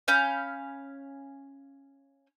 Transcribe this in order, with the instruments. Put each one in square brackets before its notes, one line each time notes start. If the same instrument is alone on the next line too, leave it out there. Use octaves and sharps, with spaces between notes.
[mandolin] C#4 F5 B5 G6